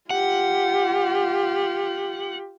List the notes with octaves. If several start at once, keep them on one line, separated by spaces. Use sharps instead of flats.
F4 G4 F#5